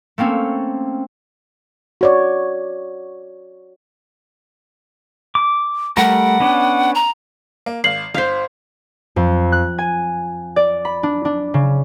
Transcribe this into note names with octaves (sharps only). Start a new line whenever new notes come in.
A3 A#3 C4 C#4
F#4 C#5 D5
D6
G3 A3 A#4 F#5
B3 C#4 D4
A#5
A#3
G#1 F5 C7 F#7
G1 C5 F5 B6
F2
F#6
G#5
D5
B5
D4
D4
C#3